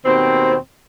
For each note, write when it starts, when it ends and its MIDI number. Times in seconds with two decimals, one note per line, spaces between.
0.05 0.55 39
0.05 0.55 47
0.05 0.55 60